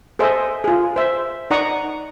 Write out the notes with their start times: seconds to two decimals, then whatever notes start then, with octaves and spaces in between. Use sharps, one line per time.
0.19 G#4 A4 C5 D#5 E5
0.64 F4 G#4
0.96 C5 E5
1.50 D#4 D5 F#5 A#5 C#6 D#6